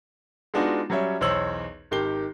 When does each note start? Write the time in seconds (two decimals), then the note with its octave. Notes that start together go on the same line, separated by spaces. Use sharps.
0.54 G#3 B3 D4 D#4 F4 F#4
0.90 F#3 G3 C#4 C#5 E5
1.21 B1 E2 C5 C#5 E6 F#7
1.91 G#1 D#3 G4 C7 G7